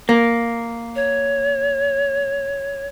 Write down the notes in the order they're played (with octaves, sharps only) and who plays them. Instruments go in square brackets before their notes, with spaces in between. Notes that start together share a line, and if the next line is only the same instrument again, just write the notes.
[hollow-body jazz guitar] A#3
[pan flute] C#5